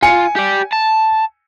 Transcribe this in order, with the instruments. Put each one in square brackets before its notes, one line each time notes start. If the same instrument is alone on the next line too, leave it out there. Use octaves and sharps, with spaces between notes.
[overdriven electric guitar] F4 [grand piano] G#5 C#7
[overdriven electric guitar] G4 D5
A5